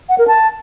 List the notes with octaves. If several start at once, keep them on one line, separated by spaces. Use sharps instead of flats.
F#5
A#4
A5